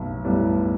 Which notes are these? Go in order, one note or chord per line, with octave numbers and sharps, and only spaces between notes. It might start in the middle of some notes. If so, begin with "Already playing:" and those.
Already playing: B1 A2 B3
A2 G3 B3